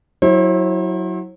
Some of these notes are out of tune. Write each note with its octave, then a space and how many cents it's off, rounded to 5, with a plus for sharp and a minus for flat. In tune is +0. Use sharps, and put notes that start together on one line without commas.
F#3 +0 E4 -15 C5 +45